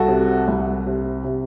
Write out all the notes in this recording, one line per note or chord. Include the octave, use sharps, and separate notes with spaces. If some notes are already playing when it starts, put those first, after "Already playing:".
Already playing: C2 F#4 A4
C3
C2
C3
C3